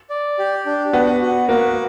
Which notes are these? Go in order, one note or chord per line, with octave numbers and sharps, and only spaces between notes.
D5
G4
D4
B3 F#4
F#4
A#3 F#4